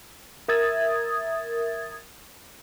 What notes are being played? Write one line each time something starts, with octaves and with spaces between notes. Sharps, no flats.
A#4 E5 D#6 G#6 A6